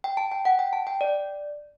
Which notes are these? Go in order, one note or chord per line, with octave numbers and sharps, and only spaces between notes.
G5
A5
G5
F#5
G5
A5
G5
D5